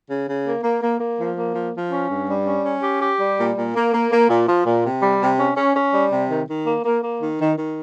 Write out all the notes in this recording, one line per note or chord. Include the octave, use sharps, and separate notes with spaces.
C#3
C#3
A#3
A#3
A#3
A#3
F3
A#3
F3
F3
C#4
G2
G3
C#4
C#4
G4
G4
G3
A#2
A#2
A#3
A#3
A#3
A#2
F3
A#2
C3
G3
C3
C#4
C#4
C#4
G3
C3
D#3
D#3
A#3
A#3
A#3
D#3
D#3
D#3